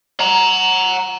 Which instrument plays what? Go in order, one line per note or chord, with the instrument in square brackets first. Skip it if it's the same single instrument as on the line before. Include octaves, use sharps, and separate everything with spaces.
[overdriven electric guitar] F#5 A#5